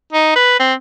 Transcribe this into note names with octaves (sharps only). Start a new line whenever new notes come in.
D#4
B4
C4